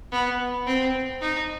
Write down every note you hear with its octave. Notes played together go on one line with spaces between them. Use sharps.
B3
C4
D#4